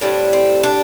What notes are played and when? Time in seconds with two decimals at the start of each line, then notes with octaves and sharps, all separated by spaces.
0.01 A2 G3 C4 D4
0.33 C4
0.63 D4